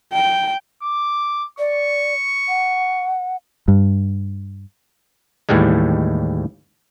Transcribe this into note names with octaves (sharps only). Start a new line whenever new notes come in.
G5
D6
D5 C#6
F#5
G2
D#2 A2 E3 G3 G#3